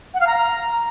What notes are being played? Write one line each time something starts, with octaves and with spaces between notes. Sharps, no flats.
F#5
F5
A#5